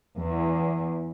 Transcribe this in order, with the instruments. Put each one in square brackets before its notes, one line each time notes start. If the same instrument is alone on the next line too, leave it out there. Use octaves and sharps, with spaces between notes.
[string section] E2